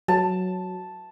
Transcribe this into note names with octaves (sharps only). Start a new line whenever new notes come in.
F#3 A5